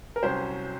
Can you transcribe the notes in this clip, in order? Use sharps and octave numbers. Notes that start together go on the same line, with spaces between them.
A#4
C2 C3 F#3 C#4 C5